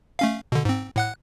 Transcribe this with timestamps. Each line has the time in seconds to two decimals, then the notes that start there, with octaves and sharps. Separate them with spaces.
0.19 A3 C#4 F5
0.52 B2 D3
0.65 G#2 C4
0.96 A2 F#5 F#6